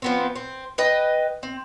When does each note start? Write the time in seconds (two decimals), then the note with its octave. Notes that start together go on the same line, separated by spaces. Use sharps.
0.02 F3 B3 C4
0.36 C4
0.78 B4 D#5 G5
1.43 C4